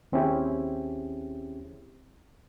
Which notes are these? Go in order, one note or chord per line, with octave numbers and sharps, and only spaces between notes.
D#2 C4 C#4 E4 G4 G#4